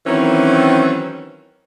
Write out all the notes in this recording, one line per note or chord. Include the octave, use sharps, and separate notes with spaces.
D#3 E3 F#3 C4 C#4